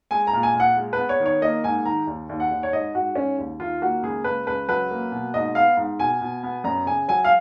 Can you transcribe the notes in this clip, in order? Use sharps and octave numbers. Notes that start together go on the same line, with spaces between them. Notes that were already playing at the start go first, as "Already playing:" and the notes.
G#3 G#5
A#5
A#2
G#5
A#2 F#5
G#3
B4
B3
C#5
D#3
C#5
A#3 D#5
G#2 G#5
D#3 A#5
D#2
D#2
F#5
D#2
C#5
G#2 D#5
G#2 F#4
G#2 C#4
D#2
D#3 F4
A#3 F#4
C#2 G#4
C#2 B4
C#2 B4
F#3 B4
A#3
B2
G#2 D#5
B3 F5
G#2
B2 G#5
B2
B3
F#2 A#5
C#3 G#5
F#3 G#5
F5